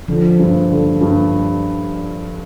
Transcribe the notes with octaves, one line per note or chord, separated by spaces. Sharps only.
D3 F3
G2
D3
G2